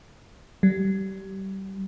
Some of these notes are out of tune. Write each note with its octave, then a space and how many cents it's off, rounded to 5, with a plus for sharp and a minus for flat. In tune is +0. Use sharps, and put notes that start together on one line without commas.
G3 -25